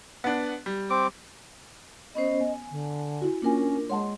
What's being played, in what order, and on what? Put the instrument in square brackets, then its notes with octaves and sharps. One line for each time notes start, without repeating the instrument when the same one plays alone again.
[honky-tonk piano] B3 D4
G3
[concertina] C4 D6
[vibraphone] B3 C#4 C5 [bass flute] D#5
[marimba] B3 [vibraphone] G#5
[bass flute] D3
[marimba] E4 F#4
[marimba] A#3 F4 G#5 [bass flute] C#4 [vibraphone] D4 A#4
[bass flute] G#3 [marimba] C#5 F#5 A5 [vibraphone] C6